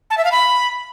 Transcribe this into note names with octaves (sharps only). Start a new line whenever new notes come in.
A5
E5
F5
B5